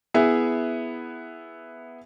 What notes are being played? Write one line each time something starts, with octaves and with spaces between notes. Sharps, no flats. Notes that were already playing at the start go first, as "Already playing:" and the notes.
B3 E4 G#4 E5